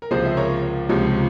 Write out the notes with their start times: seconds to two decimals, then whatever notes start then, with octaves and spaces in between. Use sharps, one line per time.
0.02 A#4
0.11 C#2 C3 F3 G#3 G#4 C5
0.25 E5
0.37 A#4 C#5
0.89 C#2 C3 F3 G#3